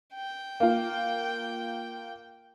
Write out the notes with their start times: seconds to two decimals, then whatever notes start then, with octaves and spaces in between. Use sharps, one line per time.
0.14 G5
0.60 A#3 F4